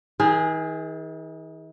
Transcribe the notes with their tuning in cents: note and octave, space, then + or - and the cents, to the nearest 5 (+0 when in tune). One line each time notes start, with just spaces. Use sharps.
D#3 +45 G#4 -5